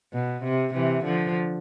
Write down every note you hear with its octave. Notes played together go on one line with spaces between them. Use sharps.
B2
C3
C3 E3
D3 F3